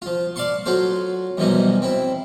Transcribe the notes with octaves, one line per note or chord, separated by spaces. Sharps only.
F3 F4
D5 F5 A5 C6 C#6
F#3 F4 F#4 A4 C5
F#2 B2 E3 F3 G3 D#4
C4 E4